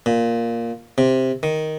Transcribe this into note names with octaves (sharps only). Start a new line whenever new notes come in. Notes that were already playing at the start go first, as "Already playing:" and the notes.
A#2
C3
D#3